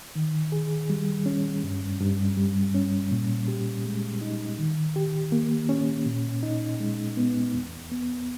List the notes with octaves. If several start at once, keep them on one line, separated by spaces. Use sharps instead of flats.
D#3
G#4
G3
C#4
G2
G2
G3
C#4
A#2
G4
G#3
D#4
D#3
G4
A#3
C#4
A#2
D#4
G#3
B3
E2
B3